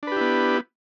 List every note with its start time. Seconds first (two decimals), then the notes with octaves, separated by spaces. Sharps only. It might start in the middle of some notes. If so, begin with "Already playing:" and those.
0.03 D4
0.07 B4
0.12 G4
0.16 E4
0.21 B3